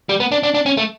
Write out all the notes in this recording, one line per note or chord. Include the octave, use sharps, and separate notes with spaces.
G3
B3
D4
D4
D4
C#4
A3